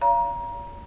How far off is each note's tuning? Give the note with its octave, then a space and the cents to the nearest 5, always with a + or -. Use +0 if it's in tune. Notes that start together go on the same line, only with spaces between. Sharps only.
C#5 +45 F5 -20 A#5 +25